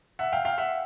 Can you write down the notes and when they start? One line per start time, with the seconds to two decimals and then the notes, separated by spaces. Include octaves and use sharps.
0.19 E5 F#5
0.32 F5 G5
0.45 F5 G5
0.58 E5 F#5